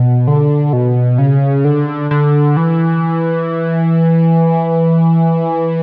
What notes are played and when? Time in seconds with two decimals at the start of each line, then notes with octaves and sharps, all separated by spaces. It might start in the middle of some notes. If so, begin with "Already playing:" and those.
Already playing: B2
0.27 D3
0.73 B2
1.18 C#3
1.65 D3
2.11 D3
2.57 E3